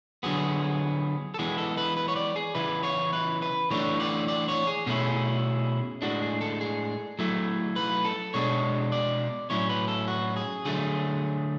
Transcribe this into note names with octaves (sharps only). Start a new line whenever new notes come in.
D3 F#3 B3 G#4
A4
E3 G#3 B3 G#4
A4
B4
B4
C#5
D5
G#4
C#3 E3 B3 E4 B4
C#5
B4
B4
E3 A3 D4 C#5
D5
D5
C#5
G#4
B2 A3 C#4 E4 G#4
A2 G#3 D4 F#4
G#4
A4
G#4
F#3 A3 E4
B4
A4
B2 G#3 D4 C#5
D5
A2 F#3 C#4 E4 C#5
B4
A4
F#4
G#4
D3 F#3 A3 G#4